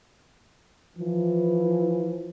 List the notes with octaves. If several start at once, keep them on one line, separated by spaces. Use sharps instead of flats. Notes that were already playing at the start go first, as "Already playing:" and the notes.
E3 F3